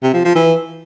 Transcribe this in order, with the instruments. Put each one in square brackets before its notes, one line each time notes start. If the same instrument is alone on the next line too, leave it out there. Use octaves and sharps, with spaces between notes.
[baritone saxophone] C3
F3
F3
E3